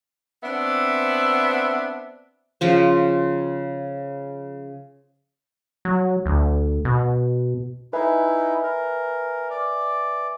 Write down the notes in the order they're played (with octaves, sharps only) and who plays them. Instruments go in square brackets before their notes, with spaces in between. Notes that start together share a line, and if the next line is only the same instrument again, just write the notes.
[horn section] B3 C4 D4 E5
[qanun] C#3 F3 C5
[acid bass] F#3
D2
B2
[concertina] D#4 E4 [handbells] B4 E5 G#5
[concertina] A#4
D5